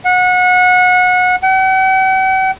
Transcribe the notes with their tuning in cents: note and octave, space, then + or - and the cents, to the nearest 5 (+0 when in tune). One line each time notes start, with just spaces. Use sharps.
F#5 -25
F#5 +45